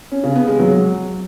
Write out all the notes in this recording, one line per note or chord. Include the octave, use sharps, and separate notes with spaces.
C#4
C#3
B3
G#3
F#3